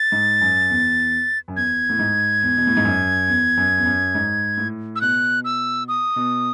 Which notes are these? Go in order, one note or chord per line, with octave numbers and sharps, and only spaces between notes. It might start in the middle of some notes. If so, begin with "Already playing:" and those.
Already playing: A6
G#2
F#2
E2
F#2
E2 G#6
A2
G#2
E2
B2
A2
G#2
F#2
E2
F#2
E2
F#2
G#2
A2
E6
B2 F#6
E6
D#6
B2